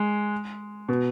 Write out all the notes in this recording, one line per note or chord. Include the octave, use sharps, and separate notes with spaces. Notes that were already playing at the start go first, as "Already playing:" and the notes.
Already playing: G#3
B2